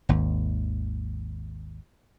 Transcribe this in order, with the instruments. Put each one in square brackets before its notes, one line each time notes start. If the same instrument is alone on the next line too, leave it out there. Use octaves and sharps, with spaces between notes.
[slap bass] G#1 D#2